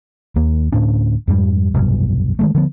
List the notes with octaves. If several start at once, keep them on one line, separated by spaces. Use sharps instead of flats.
D#2 A#3
D2 A2 C#4 D4
F2 G#2 G3
F1 B1 G2 B2
D#3 G#3 A3
D3 F3 B3